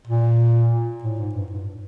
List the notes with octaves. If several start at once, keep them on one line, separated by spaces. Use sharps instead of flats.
A#2
A2
G#2
G2
G2